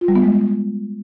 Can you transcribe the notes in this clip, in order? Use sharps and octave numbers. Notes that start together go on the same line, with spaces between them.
F4
G3
B3
G#3